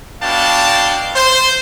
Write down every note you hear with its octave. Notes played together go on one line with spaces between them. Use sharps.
B2 D4 F5 G5 A5
C5